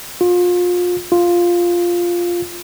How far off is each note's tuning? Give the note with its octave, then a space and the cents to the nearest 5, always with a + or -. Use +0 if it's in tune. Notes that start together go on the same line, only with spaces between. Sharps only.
F4 +30
F4 +0